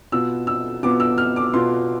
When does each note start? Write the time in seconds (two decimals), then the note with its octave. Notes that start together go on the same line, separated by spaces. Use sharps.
0.12 B2 B3 F4 E6
0.47 E6
0.83 B2 B3 F4 D6
1.00 E6
1.18 F6
1.36 D6
1.54 B2 B3 F4 C6